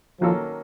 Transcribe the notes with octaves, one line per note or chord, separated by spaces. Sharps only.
D#3 F3 F#3 A#3 C#4 A4